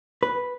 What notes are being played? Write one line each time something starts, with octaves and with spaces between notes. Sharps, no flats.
B4